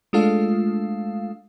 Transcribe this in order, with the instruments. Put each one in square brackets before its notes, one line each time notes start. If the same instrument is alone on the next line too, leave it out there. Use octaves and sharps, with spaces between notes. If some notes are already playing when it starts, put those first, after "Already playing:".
[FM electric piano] G#3 A3 D4 F4 A4 F5